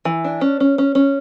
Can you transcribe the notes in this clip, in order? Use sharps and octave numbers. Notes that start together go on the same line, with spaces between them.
E3
D4
C#4
C#4
C#4
C#4